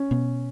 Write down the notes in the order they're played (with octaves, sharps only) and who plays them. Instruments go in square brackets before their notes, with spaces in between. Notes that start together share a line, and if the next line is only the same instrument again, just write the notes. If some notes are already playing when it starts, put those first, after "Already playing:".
Already playing: [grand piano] C#4
[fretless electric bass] B2 B3